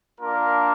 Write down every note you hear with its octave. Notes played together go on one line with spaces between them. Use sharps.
A#3 D4 F4 A#4